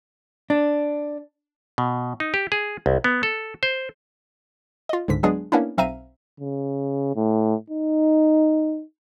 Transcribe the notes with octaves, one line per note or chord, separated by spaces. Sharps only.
D4
B2
D#4
G4
G#4
C2
B3
A4
C5
F4 D#5
C#2 G#2 D3 B6
F#3 G#3 B3 D4 G#4
A#3 B3 C#4 D4 E4
B1 C4 E5 F5 A#5 D#7
C#3
A2
D#4